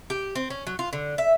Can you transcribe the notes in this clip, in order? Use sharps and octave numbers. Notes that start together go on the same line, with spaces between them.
G4
C4
C#4
F#3
F4
D3
E5